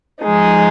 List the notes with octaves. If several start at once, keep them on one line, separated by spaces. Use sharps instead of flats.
F3 G#3 D#4